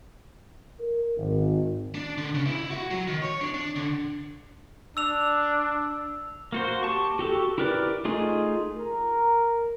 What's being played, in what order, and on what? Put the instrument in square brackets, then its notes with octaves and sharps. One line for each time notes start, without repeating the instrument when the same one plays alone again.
[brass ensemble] A#4
G#1
[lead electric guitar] D4
D3
C#3
E4
F#4
F#3
D#3
C#5
D4
D4
D3
[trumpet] D4 [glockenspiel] E6 F7
[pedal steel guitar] A#3 F#4 C5
G4 A5 C#6
F#4 G4 A4
E4 G4 A#4 B4 D5
A3 D#4 F4 G#4
[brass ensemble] A#4